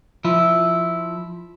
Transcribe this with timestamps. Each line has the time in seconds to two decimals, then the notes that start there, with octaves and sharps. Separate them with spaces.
0.25 F3 E4